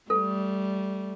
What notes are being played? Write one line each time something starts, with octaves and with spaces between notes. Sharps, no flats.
G3 A3 A4